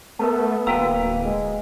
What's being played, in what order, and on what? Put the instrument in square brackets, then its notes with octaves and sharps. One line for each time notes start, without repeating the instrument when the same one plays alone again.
[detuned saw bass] A3 [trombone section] B3 [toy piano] A#4 B4 A5
[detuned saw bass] D1 [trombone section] A#3 [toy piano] F#4 F5 E6 [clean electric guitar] B4 G5 A#5
[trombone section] G#3